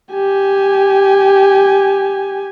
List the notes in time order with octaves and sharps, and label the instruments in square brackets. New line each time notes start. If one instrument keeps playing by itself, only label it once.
[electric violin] G4 G#5